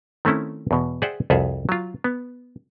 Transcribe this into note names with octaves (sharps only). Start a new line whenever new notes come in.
D#3 A3 C4 C#4 E4
E2 B2
G#4 C5 D5 E5 F#5 G5
C2 F2 F4 G#4 E5 F#5
F#3 F4
B3